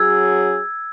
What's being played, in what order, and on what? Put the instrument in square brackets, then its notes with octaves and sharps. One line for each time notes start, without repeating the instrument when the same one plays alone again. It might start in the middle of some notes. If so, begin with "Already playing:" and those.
Already playing: [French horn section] F#3 C#4 G#4 [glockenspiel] E6 G#6